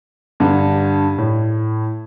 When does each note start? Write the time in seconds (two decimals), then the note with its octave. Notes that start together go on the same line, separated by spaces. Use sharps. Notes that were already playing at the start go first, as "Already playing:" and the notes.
0.40 G2 D3
1.18 A2